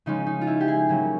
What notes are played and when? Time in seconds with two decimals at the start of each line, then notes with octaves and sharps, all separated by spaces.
0.06 C#3 F3 G#3 C#4 D#4
0.27 D#4
0.41 F4
0.47 E4
0.61 G4
0.68 G#4
0.89 C#3 F#3 A#3 C#4